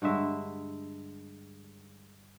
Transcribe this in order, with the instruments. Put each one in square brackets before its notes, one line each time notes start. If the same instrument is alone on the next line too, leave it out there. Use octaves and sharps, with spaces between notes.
[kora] G2 D3 G#3 E5